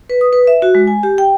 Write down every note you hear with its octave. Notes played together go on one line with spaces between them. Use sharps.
B4
D#6
B4
E5
F#4
G#3
G#5
G4
G5